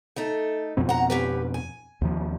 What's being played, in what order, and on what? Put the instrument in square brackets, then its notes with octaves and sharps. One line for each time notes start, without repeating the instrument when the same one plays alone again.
[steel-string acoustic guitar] A3 D#4 A4
[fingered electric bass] F2 B2 C4
[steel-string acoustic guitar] F#5 A#5
C#4 G4 B4
G#5
[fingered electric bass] D#2 C3 F3